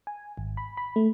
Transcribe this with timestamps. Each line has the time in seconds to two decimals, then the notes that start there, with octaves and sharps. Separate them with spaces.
0.07 G#5
0.38 G#1
0.57 B5
0.77 B5
0.96 A3